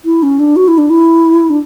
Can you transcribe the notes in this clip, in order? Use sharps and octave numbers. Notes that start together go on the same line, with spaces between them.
E4
C#4
D4
F#4
E4
D4
E4
D4